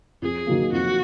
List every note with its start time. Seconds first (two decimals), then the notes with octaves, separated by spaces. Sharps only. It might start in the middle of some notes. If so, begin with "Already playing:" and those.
0.22 F2 G#4
0.47 D#3 F#3 A#3
0.72 F2 F#4